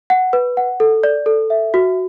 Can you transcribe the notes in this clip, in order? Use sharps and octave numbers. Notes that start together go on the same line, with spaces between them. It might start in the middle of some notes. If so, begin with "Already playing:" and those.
F#5
B4
F#5
A4
D5
A4
E5
F#4